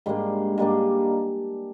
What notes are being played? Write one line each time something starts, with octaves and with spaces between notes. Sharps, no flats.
G#2 G3 A#3 D4 C6
G#2 G3 A#3 D4